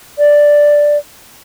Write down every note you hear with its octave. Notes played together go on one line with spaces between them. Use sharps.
D5